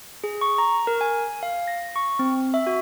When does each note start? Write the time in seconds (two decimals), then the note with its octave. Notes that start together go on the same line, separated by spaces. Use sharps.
0.24 G#4
0.41 C#6
0.58 A#5
0.87 A#4
1.01 G#5
1.43 F5
1.68 A#6
1.96 C#6
2.19 C4
2.54 E5
2.67 F#4